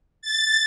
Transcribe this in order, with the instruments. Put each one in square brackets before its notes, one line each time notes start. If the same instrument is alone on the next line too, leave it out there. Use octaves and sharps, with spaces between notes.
[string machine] A6